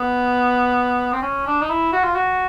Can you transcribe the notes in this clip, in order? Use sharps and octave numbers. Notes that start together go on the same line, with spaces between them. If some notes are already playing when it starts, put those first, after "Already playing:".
Already playing: B3
C4
C#4
D4
D#4
E4
F#4
F4
F#4